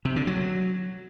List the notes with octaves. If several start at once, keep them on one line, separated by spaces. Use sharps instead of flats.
C3
D3
F#3